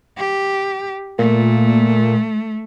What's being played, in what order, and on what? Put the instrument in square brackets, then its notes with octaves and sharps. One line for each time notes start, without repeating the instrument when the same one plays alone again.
[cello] G4
[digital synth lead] A#2 [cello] A3